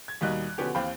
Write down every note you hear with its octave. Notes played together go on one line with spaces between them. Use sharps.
G#6
D#2 B2 D#3 G3 D#5 F#6
B2 D3 F3 B3 C#4 G4
D#2 E3 C4 F5 G5 B5